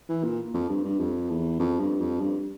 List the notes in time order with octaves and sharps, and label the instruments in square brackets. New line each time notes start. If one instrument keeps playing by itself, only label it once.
[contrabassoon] E3
A#2
F2
G2
G2
F2
E2
F2
G2
F2
G2